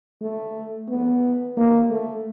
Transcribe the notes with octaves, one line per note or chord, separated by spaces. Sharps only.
A3
B3
A#3
A3